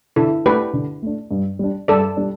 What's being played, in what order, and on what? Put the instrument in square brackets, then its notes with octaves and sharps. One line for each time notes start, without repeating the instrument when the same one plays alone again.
[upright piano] D3 [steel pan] E4 A4
[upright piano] A3 D4 [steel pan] G4 B4
[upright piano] D3
A3 D4
G2
G3 D4
[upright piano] G2 [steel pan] A4 D5
[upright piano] G3 D4